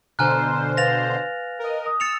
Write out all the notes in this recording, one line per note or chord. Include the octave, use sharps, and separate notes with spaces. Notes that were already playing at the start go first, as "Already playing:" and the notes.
B2 D3 C5 G#5 A#5 F6 F#6
B4 F5 A6 A#6 F7
A#4 D#5
D#6
E6 A6 C#7 F7